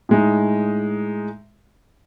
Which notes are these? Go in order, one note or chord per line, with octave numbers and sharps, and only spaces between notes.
A2 G#3 D#4